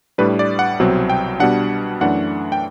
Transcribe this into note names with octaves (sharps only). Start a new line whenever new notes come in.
A2 G3 D4 B4
D5
F#5
C2 B2 F#3 C4
G5
B2 G3 D4 F#5
F#2 E3 A3 D4 F#5
G5